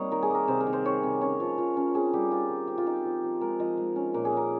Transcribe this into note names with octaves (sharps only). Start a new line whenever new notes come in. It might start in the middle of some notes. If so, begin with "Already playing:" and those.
Already playing: G3 A#3 C4 D#4 C#5 D#5
D#3 A#4
G#4
A#3 A#4
C3 C5
A#4
D#3
C5
D#3 C#5
C3
C#4 C#5
F3
F3
C#4
C4 G#4
G3 G4
C4 F4
D#3
C4 G4
F4
D#4 G4
F3
F3
G#3 A#4
F3 D#5
G#3
C#4
A#2 A#4
G#4
C#4 A#4